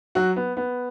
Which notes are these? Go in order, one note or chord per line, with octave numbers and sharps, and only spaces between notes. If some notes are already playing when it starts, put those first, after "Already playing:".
F#3 F#4
B3
B3